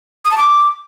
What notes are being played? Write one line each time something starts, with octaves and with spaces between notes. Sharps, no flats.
D#6
A5
D6